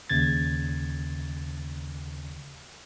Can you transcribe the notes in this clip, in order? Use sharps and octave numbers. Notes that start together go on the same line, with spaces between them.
D#2 C#3 G#6 A6